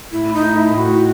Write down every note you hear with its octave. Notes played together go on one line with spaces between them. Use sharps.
A2 E4
D#4
A3
E4
A2
F#4